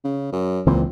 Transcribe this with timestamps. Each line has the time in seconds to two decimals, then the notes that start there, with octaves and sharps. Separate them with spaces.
0.04 C#3
0.32 F#2
0.66 C#2 A#2 E3 C4